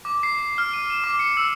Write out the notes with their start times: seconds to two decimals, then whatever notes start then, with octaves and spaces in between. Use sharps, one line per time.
0.05 D6
0.23 C7
0.39 C7
0.58 F6
0.73 D#7
0.90 E7
1.04 D6
1.19 C#7
1.37 E6